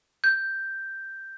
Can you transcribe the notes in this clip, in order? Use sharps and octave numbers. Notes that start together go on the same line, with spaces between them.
G6